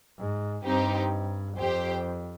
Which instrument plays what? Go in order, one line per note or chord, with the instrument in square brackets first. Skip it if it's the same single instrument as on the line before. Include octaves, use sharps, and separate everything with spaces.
[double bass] G#2
[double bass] G2 [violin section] C4 D#4 G4
[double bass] F2 [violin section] G4 C5 G5